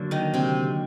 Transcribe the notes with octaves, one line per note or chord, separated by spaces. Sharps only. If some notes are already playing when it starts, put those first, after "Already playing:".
Already playing: D3 F#3 A#3 D4
D#3 D#4
C3 C4